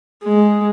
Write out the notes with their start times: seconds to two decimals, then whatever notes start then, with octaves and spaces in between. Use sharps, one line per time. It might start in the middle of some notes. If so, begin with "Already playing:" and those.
0.24 G#3